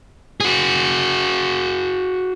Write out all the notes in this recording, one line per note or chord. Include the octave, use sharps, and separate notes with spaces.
F#4 G#4